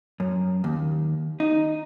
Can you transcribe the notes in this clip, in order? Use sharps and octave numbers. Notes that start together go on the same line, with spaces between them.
F#2
D#2
D#4